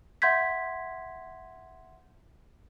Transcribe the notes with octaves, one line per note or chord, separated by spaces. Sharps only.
E5 F#5 C6 G6 G#6 B6